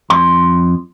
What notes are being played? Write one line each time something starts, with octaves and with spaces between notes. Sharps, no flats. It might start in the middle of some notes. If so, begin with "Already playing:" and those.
F2 C6